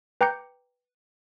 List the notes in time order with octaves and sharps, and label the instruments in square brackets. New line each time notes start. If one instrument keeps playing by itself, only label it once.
[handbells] B4 G5 A#5 D6 G6 C#7